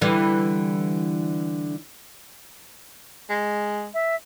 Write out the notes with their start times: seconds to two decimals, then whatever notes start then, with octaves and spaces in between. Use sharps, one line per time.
0.01 D3 E3 G3
3.30 G#3
3.94 E5